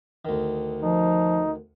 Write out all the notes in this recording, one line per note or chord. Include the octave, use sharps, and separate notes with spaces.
D2 D#3
F3 D#4